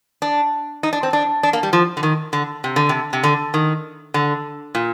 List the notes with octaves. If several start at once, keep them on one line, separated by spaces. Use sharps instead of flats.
D4
D#4
D4
C4
D4
D4
A#3
G3
F3
D3
D#3
D3
C3
D3
C3
C3
D3
D#3
D3
A#2